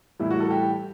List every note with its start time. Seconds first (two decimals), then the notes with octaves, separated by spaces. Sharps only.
0.19 A2 E3 G3 E4
0.31 F#4
0.40 A4
0.51 G4